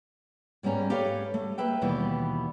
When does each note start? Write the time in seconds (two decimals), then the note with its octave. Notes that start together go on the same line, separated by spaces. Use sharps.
0.63 G#2 G3 B3 C#4 A#5
0.90 G4 A4 B4 C#5 F5
1.34 A3
1.58 A#3 B4 E5 G5
1.82 D#2 B2 E3 G3 B3